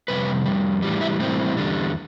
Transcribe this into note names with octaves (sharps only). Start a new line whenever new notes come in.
F2 C3 G3 B4
F2 C3 G3
A2 E3 G3
E4
A2 E3 G3 C4
E2 D3 G3